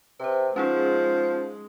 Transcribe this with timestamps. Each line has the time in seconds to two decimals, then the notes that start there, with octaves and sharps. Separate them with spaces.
0.20 C3 B4 C5
0.56 F3 G#3 C#4 D#4 G#4